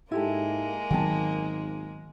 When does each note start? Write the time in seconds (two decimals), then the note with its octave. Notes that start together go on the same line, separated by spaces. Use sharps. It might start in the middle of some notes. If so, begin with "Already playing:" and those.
0.11 G#2 G#3 A#3 E4 G4 A4
0.90 G#1 D#3 F#3 B3 G5 A5